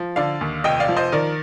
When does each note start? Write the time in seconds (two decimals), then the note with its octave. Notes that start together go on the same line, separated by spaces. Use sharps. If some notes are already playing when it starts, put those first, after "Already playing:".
Already playing: F3
0.16 D3 D5 F5
0.41 D#2
0.64 F1 D#5 G5
0.80 D5 F5
0.88 F3
0.97 C5 D#5
1.12 D#3 A#4 D5